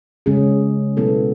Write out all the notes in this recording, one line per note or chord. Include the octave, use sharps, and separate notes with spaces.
C#3 G#3 C#4 G#4
B2 F#3 B3 E4 A4